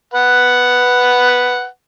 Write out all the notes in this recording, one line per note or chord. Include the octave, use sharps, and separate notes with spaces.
B4 F#5